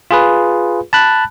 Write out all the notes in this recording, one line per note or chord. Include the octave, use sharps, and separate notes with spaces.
F4 G#4 B4
A5 B5 F#6